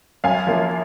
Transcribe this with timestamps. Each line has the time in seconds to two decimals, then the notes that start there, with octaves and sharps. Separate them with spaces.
0.24 F#2 F5 G#5
0.47 F3 A#3